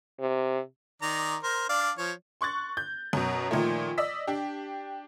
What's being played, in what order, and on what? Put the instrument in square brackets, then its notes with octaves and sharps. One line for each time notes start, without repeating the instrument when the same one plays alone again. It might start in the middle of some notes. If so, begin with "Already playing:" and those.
[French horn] C3
[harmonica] D#3 D5 A#5
A#4 C5
D4 D5 F5
F3 C#5
[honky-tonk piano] C6 C#6 F#6 A6
G6
F#2 B2
A#2 D#3 F3 A3
D5 D#5 E6 B6
D4 G4